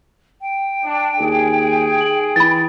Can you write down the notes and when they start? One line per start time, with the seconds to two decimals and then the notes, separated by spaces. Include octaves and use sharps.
0.41 G5
0.84 D4
1.20 D#2 G#4
1.97 D7 F#7
2.36 E3 B5 A6